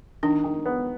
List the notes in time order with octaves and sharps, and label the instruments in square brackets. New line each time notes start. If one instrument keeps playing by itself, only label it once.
[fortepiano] D#3 [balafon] D4
[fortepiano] D#3
B3